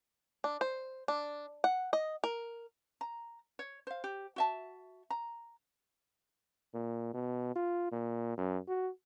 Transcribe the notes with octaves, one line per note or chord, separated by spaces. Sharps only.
D4
C5
D4
F#5
D#5
A#4
A#5
C#5
C5 F5
G4
F#4 E5 A5
A#5
A#2
B2
F4
A#2
F#2
F#4